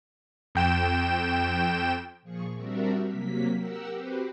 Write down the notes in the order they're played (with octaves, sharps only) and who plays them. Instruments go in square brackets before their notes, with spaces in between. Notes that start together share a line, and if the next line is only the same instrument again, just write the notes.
[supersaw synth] F2 G5 E7
[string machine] A#2 F3 G#4 C#6
G3 C4 D4 F#4 A#4 E5
C3 F#3 A#3 B6
G4 A#4 F#5 E6
C4 F#4 G4 B4 C5